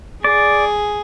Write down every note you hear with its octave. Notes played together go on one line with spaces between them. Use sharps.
G#4 D5